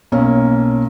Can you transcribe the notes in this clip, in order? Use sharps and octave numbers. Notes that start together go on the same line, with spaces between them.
B1 A#3 C#4